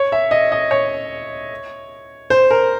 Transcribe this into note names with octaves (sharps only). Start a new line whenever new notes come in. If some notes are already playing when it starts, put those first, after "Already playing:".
Already playing: C#5
E5
D#5
D#5
C#5
C5
A#4